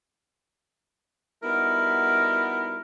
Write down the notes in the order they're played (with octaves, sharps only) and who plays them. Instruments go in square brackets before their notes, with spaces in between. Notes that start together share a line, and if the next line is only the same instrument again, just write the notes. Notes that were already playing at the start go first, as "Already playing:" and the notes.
[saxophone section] G3 B3 D#4 E4 F#4 A#4